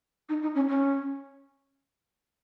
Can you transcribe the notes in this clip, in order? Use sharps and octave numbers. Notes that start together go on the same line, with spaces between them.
D#4
D#4
C#4
C#4